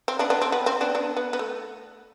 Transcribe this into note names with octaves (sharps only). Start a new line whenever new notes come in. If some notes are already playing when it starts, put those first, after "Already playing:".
C4
B3 D4
B3 D4
C4
B3
C4
B3 D4
B3 D4
B3
B3
A3